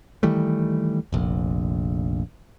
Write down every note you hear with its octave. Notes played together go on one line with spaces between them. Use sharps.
D#3 E3 G3 A3
F1 A#1